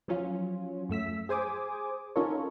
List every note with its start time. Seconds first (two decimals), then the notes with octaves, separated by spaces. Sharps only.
0.08 F3 F#3 C#4 F4
0.89 F#2 A3 E6 B6
1.29 G#4 C5 G#5 D6 D#6
2.16 C#4 D#4 F4 A4 A#4 C#5